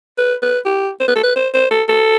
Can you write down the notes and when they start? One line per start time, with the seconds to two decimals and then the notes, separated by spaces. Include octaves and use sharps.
0.18 B4
0.42 B4
0.65 G4
1.00 C5
1.08 B4
1.16 A4
1.23 B4
1.36 C5
1.54 C5
1.71 A4
1.89 A4